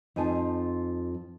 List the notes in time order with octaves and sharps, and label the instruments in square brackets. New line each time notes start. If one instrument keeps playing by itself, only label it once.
[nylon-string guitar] F2 D#4 F4 G#5 A5